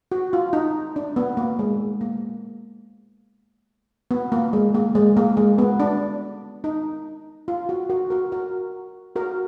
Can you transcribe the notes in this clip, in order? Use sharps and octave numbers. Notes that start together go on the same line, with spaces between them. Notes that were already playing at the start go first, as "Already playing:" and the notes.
F#4
F4
D#4
D4
B3
A#3
G#3
A#3
B3
A#3
G#3
A#3
G#3
A#3
G#3
B3
D4
D#4
F4
F#4
F#4 A#4
F#4 A#4
F#4 A#4
F#4 A#4